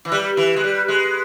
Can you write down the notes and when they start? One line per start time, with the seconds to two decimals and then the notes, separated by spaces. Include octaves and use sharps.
0.05 E3
0.12 G3 B4
0.37 E3
0.56 G#3
0.64 G3
0.88 G#3